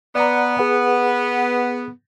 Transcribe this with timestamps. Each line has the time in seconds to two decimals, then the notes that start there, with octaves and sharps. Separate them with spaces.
0.15 B3 D5 F#5 A#5
0.59 G#4 B4 F#5